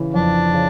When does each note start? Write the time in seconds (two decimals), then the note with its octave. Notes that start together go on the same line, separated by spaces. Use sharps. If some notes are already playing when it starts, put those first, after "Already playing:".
Already playing: C#3 E3
0.14 F2 D4
0.54 C#3